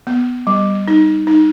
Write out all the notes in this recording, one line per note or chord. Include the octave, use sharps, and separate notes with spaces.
B3
G3
D#4
D#4